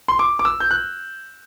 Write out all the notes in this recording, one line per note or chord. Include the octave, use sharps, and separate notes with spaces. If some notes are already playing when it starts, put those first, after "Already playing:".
C6
D6
D6
E6
G6
F#6